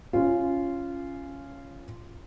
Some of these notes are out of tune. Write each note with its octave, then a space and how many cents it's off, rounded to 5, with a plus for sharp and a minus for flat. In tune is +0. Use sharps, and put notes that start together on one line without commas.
C#4 +0 F4 -15